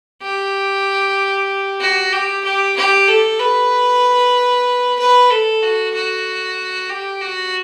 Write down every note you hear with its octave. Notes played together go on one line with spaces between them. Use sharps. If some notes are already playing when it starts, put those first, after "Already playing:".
G4
F#4
G4
G4
G4
A4
B4
B4
A4
F#4
F#4
G4
F#4